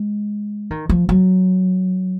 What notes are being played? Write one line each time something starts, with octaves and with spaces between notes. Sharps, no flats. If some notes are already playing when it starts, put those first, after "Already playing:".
Already playing: G#3
D#3
F3
F#3